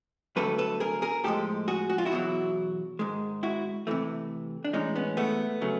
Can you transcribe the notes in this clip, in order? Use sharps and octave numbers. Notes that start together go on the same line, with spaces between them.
G2 D3 F#3 A3 A4 B4
A4 B4
G#4 A#4
G#4 A#4
A2 F3 G#3 G4 A4
F#4 G#4
F#4
F4
E4 F#4
E2 B2 F#3
G#2 D#3 G#3
E4 F#4
C3 E3 A3
D4
A2 E3 G#3 C#4 D#4
B3 C#4
A3 B3
C#3 F#3 A3